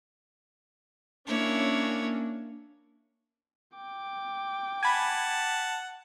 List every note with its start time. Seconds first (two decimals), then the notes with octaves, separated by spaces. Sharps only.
1.27 A#3 C#4 D4 E4 C#5
3.75 G5 D6
4.83 F#5 G#5 A5 B5 G#6